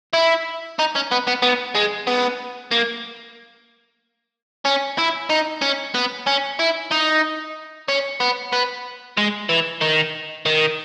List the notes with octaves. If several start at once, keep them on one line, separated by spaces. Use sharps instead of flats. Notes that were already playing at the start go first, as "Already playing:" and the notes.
E4
D#4
C#4
B3
B3
B3
G#3
B3
A#3
C#4
E4
D#4
C#4
B3
C#4
E4
D#4
C#4
B3
B3
G#3
E3
D#3
D#3